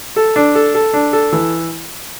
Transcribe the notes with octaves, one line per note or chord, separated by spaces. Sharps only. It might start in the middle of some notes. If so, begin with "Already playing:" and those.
A4
D4
A4
A4
D4
A4
E3